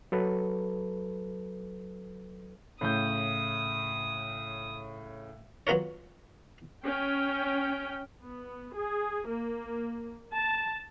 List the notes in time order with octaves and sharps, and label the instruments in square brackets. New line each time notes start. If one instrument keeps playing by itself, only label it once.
[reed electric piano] F#3 A4 B4
[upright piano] A2 C#3 G6 [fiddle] D#6
[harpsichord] F#3 B3 F4 A#4 C#5
[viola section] C#4 G5
B3
G#4
A#3
A5